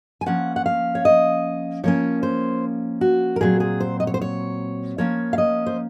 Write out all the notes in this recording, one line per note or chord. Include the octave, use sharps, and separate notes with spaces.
G#5
F3 A#3 C#4 F#5
F#5
F5
C#5
D#5
F3 A#3 C#4 C#5
C5
F#4
A#4
A#2 F#3 C4 G#4
G#4
C5
D#5
C#5
C5
C#5
F3 A#3 C#4 C#5
F5
D#5
C5